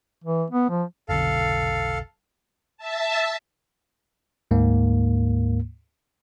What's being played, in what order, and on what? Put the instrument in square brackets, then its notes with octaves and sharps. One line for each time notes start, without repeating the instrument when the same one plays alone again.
[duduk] E3
B3
F3
[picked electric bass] F1 B1 D3 [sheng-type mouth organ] A4 F5
[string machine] E5 A5
[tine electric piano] D2 G#2 A#3